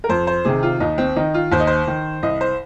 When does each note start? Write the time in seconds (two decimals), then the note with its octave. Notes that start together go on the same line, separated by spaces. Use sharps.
0.04 A#4
0.09 F2 C5
0.27 C5
0.45 C3 D#3 G#4
0.63 F4
0.80 D#2 D#4
0.98 C4
1.16 D#3 D#4
1.34 F4
1.52 D#2 C5
1.60 D#5
1.67 C5
1.87 D#3
2.22 C2 D#5
2.41 C5